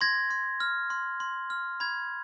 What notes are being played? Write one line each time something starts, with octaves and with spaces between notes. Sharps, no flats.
C6 G#6 A#6
C6
F6
C6
C6
F6
B5 G#6